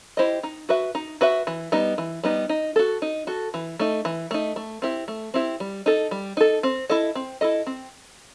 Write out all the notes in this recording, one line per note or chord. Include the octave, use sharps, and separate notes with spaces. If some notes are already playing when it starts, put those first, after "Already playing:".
E4 G4 C5 D#5
D#4
F#4 B4 E5
D#4
F#4 B4 E5
E3
G3 B3 D#4
E3
G3 B3 D#4
D#4
F#4 A4
D#4
F#4 A4
E3
A3 D#4
E3
A3 D#4
A3
C4 E4 G4
A3
C4 E4 G4
G3
D#4 A4
G3
D#4 A4
C4
E4 A4 D#5
C4
E4 A4 D#5
C4